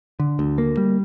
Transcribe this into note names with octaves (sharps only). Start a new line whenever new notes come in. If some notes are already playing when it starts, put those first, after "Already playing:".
D3
D2
A#3
G3